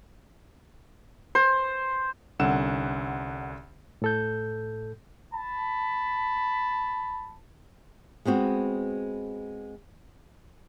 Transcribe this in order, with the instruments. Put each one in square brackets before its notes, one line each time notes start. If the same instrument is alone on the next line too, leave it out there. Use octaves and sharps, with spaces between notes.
[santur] C5
[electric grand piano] C2 D3 C#4 F#5 E6 E7
[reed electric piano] A2 A4 G6
[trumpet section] A5 B5
[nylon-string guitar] G#3 B3 C4 F#4